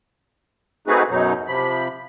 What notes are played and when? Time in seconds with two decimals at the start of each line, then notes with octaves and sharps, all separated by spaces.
0.87 A3 C4 D#4 F#4 G#4 B4
1.10 F#2 B2 F#3 D#4
1.47 C3 F3 B5